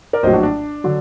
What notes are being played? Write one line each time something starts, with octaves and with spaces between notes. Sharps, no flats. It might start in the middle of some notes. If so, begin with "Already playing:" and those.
A#4 D5
A#1 A2 F#3 C5 D#5
D4 F#4
D4
D3 F#3